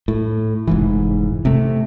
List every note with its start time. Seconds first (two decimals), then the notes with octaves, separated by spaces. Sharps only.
0.08 A2
0.67 F1 G#2 E3
1.45 C3 A3